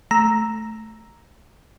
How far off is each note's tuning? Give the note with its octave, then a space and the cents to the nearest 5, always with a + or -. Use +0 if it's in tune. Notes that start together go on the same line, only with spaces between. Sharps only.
A3 -10 A#5 +0 E6 -5